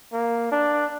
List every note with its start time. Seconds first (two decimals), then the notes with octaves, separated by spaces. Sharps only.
0.13 A#3
0.52 D4